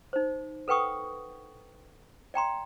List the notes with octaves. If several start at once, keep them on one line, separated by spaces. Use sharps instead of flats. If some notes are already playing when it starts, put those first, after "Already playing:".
D#4 C5
A4 B4 F#5 G5 C#6 D#6
D5 G5 A#5 C6